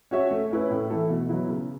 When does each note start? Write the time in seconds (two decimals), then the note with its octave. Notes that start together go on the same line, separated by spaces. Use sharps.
0.11 C#4 F#4 C#5 E5
0.31 A3
0.51 C#4 E4 B4
0.70 A2
0.90 E3 A3 E4 A4
1.09 B2
1.29 F#3 B3 E4
1.49 C#3